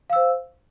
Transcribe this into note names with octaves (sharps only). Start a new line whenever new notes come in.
C5 F5 E6